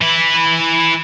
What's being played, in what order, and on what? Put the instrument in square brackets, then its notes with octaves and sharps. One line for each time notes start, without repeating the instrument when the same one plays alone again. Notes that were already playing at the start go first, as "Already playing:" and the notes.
[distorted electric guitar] E3 B4